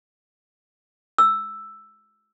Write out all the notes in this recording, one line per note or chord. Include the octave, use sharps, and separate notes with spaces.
E6